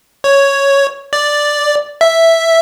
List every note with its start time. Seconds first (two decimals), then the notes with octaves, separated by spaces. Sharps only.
0.24 C#5
1.13 D5
2.01 E5